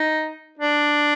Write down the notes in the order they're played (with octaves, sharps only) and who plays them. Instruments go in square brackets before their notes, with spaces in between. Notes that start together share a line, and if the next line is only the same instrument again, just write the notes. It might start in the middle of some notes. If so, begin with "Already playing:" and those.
Already playing: [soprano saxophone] D#4
D4